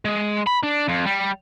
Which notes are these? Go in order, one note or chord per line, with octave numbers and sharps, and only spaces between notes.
G#3
B5
D4
F2
G3